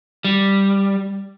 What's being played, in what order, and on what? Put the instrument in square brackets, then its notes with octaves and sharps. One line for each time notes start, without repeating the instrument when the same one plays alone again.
[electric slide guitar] G3